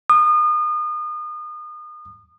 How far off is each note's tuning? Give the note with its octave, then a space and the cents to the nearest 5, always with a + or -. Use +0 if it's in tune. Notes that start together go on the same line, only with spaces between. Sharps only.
D#6 -35